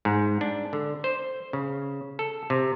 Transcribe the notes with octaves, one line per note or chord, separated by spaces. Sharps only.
G#2
D4
D3
C5
C#3
A4
C3